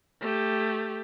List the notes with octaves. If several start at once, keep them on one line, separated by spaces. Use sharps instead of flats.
A3 G4